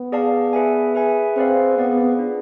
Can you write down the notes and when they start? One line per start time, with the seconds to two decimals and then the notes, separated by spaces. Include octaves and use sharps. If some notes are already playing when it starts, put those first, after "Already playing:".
Already playing: B3
0.12 G#4 D5 F5 A5
0.53 G#4 B4 E5 G#5
0.95 G#4 B4 E5 G#5
1.36 C4 G#4 B4 D5 F5
1.78 B3 G#4 B4 D5 F5
2.19 D4 F4 G#4